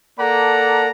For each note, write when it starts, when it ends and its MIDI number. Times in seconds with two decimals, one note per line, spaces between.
0.19 0.90 58
0.19 0.90 69
0.19 0.90 74
0.19 0.90 78
0.19 0.90 81
0.19 0.90 82